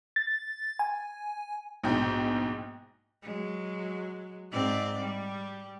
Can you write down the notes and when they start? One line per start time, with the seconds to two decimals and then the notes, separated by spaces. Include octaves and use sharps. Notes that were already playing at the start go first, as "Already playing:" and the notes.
0.16 A6
0.79 G#5
1.83 A#1 G#2 B2 G5
3.23 F#3 G#3
4.52 G#2 C4 D5
5.01 G3